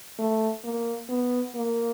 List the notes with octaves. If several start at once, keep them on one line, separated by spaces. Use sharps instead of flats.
A3
A#3
B3
A#3